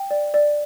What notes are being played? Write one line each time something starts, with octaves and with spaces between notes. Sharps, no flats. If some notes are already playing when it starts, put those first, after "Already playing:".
Already playing: G5
D5
D5